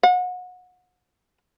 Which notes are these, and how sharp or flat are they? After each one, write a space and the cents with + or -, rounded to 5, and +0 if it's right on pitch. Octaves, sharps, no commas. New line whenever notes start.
F#5 -30